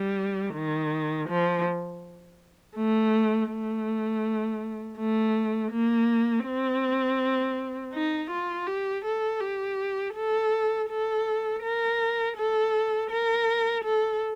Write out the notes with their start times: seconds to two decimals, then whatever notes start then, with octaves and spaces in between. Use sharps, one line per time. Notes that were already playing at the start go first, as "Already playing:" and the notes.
Already playing: G3
0.54 D#3
1.29 F3
2.76 A3
3.50 A3
4.98 A3
5.72 A#3
6.46 C4
7.93 D#4
8.31 F4
8.67 G4
9.05 A4
9.41 G4
10.15 A4
10.90 A4
11.63 A#4
12.37 A4
13.10 A#4
13.84 A4